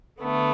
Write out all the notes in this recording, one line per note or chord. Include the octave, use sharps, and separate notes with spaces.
D3 A3 B3